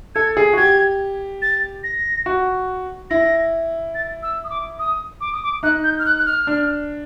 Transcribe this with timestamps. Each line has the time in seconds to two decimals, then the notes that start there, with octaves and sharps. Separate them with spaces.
0.15 A4 G#6
0.37 G#4
0.53 F#4
0.57 G4 G#6
1.42 A6
1.84 A#6
2.26 F#4
3.10 E4 A#6
3.95 A6
4.23 E6
4.44 D#6
4.50 D6
4.79 D#6
5.21 D6
5.33 D#6
5.43 D6
5.63 D#4 F#6
5.84 G6
5.99 F6
6.06 F#6
6.19 F#6
6.26 F6
6.47 D4